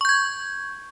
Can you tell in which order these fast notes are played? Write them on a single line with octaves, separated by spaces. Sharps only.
C#6 G6 G#6